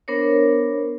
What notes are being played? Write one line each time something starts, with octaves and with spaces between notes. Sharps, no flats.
B3 D4 A#4 C5 C#5